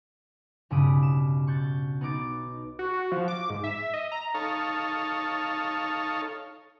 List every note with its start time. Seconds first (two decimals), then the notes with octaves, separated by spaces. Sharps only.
0.70 B1 G2 C#3 B5 D6 D#6
1.03 E7
1.47 C#6 F#6 G6 A6
2.01 B3 D#4 D6 A6
2.79 F#4
2.93 F#4
3.12 F3
3.28 D6
3.50 G#2
3.64 E5
3.94 D#5
4.12 A#5
4.34 D#4 A4 C#5 F5